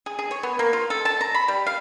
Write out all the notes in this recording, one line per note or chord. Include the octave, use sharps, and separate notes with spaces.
G#4
G#4
C#5
B3
A#3
F4
A4
A5
A#5
B5
G3
F5